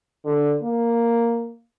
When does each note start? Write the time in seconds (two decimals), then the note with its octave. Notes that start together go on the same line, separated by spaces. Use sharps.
0.25 D3
0.62 A#3